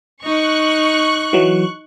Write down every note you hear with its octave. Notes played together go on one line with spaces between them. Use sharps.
D#4 C#6 F#6
E3 F#3